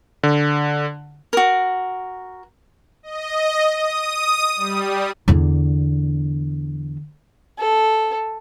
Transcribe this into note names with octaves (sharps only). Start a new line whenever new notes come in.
D3
F#4 A#4
D#5
D#6
G3
E2 D3
A4